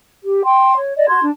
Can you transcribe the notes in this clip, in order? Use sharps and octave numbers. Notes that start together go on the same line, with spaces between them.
G4
G5 C6
C#5
D5 D#5
F#4 C6 G#6
D4